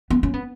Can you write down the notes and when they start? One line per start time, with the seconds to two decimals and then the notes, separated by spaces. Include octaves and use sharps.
0.10 B3
0.23 C#4
0.34 B3